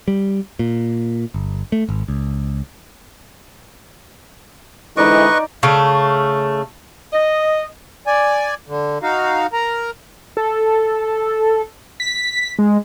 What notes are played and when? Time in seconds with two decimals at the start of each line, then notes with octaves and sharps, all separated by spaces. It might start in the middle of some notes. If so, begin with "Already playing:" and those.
0.08 G3
0.59 A#2
1.34 G1
1.72 A3
1.89 G#1
2.08 C#2
4.97 G#2 D3 E3 D#4 B4 D5 D#5 C#6
5.63 C#3 A3
7.13 D#5
8.07 D5 G#5
8.68 D3
9.03 D#4 F#4 F5
9.53 A#4 A#5
10.37 A4
12.00 B6
12.59 G#3